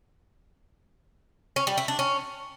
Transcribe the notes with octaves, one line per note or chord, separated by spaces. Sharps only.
C#4
G3
E4
D4
C#4